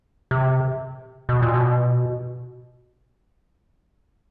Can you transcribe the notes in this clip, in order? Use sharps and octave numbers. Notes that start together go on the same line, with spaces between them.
C3
B2
A#2
B2